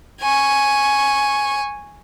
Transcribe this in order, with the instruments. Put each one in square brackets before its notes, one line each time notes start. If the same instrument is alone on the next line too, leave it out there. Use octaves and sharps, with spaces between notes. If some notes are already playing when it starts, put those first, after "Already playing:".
[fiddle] G#5 C#6